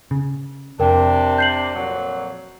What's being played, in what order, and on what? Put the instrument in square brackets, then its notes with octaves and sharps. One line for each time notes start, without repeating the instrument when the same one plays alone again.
[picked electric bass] C#3
[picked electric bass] F1 [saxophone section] C3 D4 [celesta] A#4 G5
[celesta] G6 C7 F#7
[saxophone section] F2 A#2 F#3